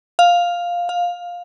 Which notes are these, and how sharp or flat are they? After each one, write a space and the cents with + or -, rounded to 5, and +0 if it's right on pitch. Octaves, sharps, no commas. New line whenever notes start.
F5 +5
F5 +15